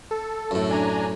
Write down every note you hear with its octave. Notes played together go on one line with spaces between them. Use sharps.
A4
F#2 A2
D4 G#5 A#5